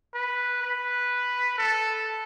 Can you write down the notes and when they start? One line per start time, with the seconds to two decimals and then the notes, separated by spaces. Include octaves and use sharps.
0.14 B4
0.63 B4
1.58 A4